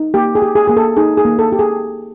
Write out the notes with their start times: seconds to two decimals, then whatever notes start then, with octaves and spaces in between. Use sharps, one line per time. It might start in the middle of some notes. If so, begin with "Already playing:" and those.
Already playing: D#4
0.14 A#3 G4
0.35 G#4
0.42 G4
0.55 G#4
0.67 A#3 G#4
0.77 A4
0.97 D#4 G#4
1.18 G#4
1.25 A#3
1.39 A4
1.52 G4
1.59 G#4